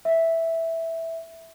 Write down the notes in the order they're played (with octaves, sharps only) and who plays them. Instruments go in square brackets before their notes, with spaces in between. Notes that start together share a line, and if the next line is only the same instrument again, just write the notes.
[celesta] E5